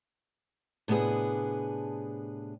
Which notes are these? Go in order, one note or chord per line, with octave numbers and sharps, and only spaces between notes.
A2 C3 B3 D4 G#4